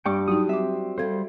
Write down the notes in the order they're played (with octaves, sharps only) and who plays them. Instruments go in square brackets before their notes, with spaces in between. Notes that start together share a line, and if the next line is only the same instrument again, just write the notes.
[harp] G2 [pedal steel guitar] G5 C#6 D6
[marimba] F#3 D#4 [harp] F#4 [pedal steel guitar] D#6
[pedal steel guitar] C4 [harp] E5 [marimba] D6 E6
[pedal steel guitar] G3 C5 [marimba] A4 F5 G#6